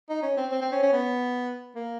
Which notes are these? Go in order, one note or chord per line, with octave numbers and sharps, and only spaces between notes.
D#4
C#4
C4
C4
C4
C#4
C#4
B3
A#3